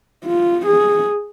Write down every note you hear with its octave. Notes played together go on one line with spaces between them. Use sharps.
F4
G#4